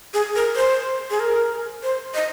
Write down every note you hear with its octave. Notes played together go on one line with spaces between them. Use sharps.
G#4
A#4
C5
G#4
A#4
C5
D#5